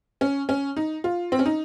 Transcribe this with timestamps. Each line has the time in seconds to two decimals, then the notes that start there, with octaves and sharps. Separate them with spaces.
0.21 C#4
0.49 C#4
0.77 D#4
1.04 F4
1.32 C4
1.39 C#4
1.46 D#4